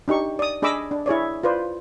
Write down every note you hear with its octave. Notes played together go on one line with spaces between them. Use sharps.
D4 D#4 G4 C#6
D5 D#6
D4 G#4 D#5 B5 D6 E6
D4
E4 G#4 C#5 D5
F4 B4 C5 D5